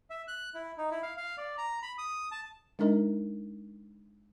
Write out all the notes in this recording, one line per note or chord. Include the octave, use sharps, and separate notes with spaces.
E5
F#6
E4
D#4
E4
F5
F5
D5
A#5
B5
D#6
A5
G#3 D4 D#4 A#4 D#5